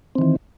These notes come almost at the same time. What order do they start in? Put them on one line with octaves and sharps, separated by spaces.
C4 D#3 E3